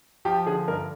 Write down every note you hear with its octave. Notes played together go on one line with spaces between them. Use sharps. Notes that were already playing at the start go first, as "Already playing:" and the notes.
F3 G4
D3 G#4
G2 A#4